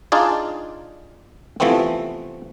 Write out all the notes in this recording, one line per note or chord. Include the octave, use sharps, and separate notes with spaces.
D4 D#4 F4 G#4 D5
C3 E3 F3 A3 B3 C4